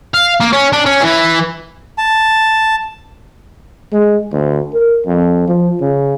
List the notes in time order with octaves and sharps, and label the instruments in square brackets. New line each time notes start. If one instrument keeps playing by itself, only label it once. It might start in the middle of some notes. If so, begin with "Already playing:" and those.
[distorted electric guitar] F5
A#3
C#4
D4
C#4
E3
[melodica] A5
[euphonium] G#3
D2
A#4
F2
F3
C#3